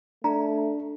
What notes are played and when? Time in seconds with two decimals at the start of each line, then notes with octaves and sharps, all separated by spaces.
0.24 A3 D4 A#5